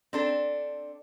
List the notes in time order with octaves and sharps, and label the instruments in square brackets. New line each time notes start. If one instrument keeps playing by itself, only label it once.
[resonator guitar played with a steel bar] C4 D4 A4